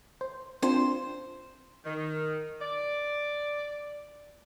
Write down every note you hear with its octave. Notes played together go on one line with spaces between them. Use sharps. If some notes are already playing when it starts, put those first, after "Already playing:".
C5
C4 D4 F4 C5
D#3
D5